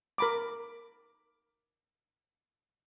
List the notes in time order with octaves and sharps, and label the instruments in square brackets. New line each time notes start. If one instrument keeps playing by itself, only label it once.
[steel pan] A#4 B5 D6